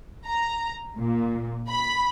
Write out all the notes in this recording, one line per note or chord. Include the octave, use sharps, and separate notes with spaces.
A#5
A#2
B5